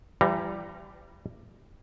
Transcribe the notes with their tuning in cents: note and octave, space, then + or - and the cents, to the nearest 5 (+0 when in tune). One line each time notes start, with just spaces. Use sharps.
E3 +45 G3 +0 A#5 +0